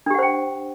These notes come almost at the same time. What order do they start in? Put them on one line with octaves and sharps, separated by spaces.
D4 G4 F#5 C5 G5